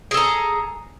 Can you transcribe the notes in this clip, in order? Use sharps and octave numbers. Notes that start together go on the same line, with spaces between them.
G#4 A4 A#5